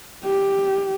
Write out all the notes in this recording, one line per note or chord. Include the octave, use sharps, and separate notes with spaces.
G4